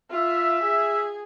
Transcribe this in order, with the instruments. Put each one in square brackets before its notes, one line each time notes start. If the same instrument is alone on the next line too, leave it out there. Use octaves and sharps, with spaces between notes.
[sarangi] F4 [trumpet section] E5
[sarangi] G#4